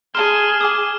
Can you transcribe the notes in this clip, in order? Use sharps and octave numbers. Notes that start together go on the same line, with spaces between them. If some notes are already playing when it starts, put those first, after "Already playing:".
G#4 A5 A#5 C6 F6 E7 G7
G#5 D6 D#6